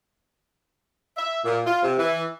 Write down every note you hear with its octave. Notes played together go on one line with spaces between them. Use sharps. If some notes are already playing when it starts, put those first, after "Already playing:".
E5
A#2
F4
C3
E3